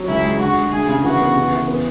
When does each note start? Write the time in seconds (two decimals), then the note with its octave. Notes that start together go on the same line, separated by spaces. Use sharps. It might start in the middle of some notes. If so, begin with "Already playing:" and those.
Already playing: F#3
0.08 C#2 E4
0.25 G#3
0.40 D3 F#4
0.56 G#3
0.72 D2 G#4
0.88 C#3
1.04 E3 F#4
1.20 B3
1.36 C#3
1.52 E3
1.68 B3